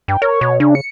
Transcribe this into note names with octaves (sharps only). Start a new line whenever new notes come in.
G2 G5
A#4 C#5
B2
C#3 D4
C#7